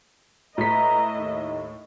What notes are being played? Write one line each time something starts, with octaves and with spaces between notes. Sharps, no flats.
A2 B4 D#5 E5 A#5 B6
D#2 D#4